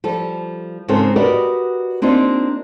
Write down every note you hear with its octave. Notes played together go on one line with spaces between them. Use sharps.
F3 G3 A4
G#2 C#3 C4 F4 A4 A#4
F#4 G4 A#4 B4 D5 D#5
A#3 C4 D4 D#4 F4 G4